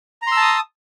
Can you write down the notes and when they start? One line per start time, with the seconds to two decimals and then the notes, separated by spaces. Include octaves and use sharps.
0.22 A#5
0.27 C6
0.32 E6
0.37 A5
0.42 D#6